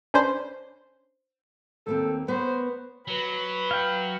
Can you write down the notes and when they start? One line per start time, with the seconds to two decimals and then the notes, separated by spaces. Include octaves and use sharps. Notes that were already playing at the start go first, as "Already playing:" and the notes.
0.14 C#4 D4 B4 C5
1.87 D#2 A#3 C4 A4
2.28 B3 A#4 C5 C#5
3.08 F#3 B4
3.71 F5 G5